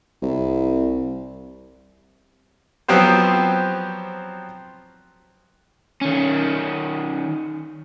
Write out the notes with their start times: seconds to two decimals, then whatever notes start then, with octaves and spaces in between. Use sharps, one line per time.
0.22 C2
2.88 F3 F#3 B3 C4 G4 C5
6.01 D#3 C#4